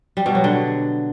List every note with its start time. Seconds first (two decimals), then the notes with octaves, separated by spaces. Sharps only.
0.17 G3
0.26 B2
0.35 F#3
0.44 D3